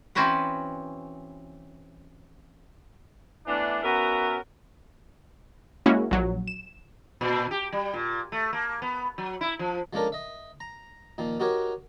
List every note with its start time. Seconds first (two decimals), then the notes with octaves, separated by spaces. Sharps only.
0.15 E3 C4 C#4 F#4 B4 F#5
3.47 E3 A3 B3 D4
3.83 B3 C#4 F#4 A#4 E5 A#5
5.86 G#3 A#3 C#4 E4 F#4
6.11 A#1 F#3
6.48 E7
7.21 A#2
7.51 G4
7.72 G3
7.94 A#2
8.32 A3
8.53 A#3
8.82 B3
9.18 F#3
9.41 E4
9.59 F3
9.93 F3 G#3 C#4 D4 A4 A#4
10.12 D#5 E5
10.60 A#5
11.18 A#2 D#3 F3
11.40 D#4 F#4 G4 A#4 C#5